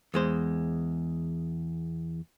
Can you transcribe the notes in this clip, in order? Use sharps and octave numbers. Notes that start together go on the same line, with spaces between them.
E2 G#3 C5